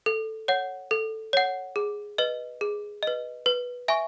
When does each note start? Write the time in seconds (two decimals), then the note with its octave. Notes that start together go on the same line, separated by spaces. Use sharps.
0.06 A4
0.48 C#5 F#5
0.91 A4
1.33 C#5 F#5
1.76 G#4
2.18 B4 D#5
2.61 G#4
3.03 B4 D#5
3.46 B4
3.88 E5 G#5 C#6